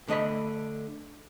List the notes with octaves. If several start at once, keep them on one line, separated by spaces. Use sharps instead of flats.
D3 A3 D#5 A#5 B5